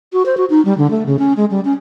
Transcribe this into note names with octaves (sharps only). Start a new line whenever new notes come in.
F#4
C5
F#4
D#4
G3
D3
A3
C#3
C#4
G#3
G3
C#4